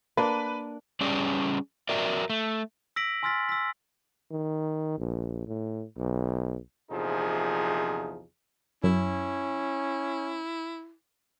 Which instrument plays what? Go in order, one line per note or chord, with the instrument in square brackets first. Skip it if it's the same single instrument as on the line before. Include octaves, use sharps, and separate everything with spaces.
[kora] A#3 D4 [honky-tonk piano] B4
[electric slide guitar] G3 C#4 G4 G#4 D5
F#4 A#4 D5 E5
A3
[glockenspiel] E6 A#6 B6 D7 F#7
G#5 C6 E6 F6 A6 B6
E6 B6
[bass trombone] D#3
A#1
A2
B1
[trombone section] A#1 E2 C3 F3 D#4 G#4
[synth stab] F#2 [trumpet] C#4 [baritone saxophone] E4